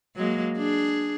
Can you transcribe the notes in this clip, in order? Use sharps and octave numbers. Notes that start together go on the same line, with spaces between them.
F#3 G#3 A#3
D4 G#4